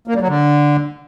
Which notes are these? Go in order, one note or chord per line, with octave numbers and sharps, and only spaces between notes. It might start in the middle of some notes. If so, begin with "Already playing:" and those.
A#3
G3
F#3
D3